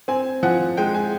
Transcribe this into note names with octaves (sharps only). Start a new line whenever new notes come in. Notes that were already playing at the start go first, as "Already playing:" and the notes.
C4 G#5
F3 F#5
G#3 G5
G#5